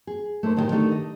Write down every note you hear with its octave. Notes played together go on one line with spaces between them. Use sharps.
G#4
A3 A#3 D#4 C5
A2 D#3 B3 C4 D#4 G4
D3 D#3 A3 D#4 G4
D#5